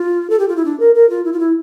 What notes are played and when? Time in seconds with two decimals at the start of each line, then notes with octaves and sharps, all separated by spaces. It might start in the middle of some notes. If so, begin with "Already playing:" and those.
Already playing: F4
0.29 A4
0.39 G4
0.48 F4
0.56 E4
0.65 D4
0.79 A#4
0.95 A#4
1.09 F4
1.24 E4
1.32 F4
1.39 E4